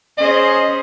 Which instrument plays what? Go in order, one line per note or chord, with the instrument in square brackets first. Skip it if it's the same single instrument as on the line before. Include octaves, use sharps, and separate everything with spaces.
[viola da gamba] C#4 G#4 C5 [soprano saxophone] D#5